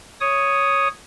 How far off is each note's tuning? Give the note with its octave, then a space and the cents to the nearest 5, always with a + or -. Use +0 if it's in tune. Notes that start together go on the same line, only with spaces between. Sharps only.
C#5 +0 D#6 +0